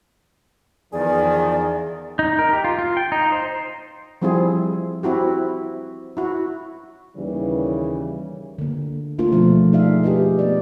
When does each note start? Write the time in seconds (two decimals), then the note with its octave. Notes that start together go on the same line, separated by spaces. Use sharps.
0.93 E2 D#3 F3 G#4 D5
2.19 D#4
2.39 A#4
2.53 G4
2.64 F4
2.78 F4
2.97 G5
3.12 D#4
3.32 C5
4.22 F3 G3 C4 E4 F4 G#4
5.03 C4 E4 F#4 G4
6.17 E4 F#4
7.17 D#2 C#3 E3 G3
8.58 D3 A#3
9.18 A3 A#3 D4 F4 A#4 C5
9.32 B2 F3 A3 C4
9.73 D#4 G#4 A4 D5 E5 F5
10.03 G4 G#4 B4 D#5
10.38 A#3 B3 D5 D#5